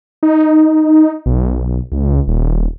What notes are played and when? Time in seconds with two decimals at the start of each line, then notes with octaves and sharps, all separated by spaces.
0.23 D#4
1.26 B1
1.92 C#2
2.28 D#1